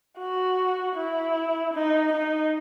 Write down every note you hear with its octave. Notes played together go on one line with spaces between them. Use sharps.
F#4
E4
D#4
D#4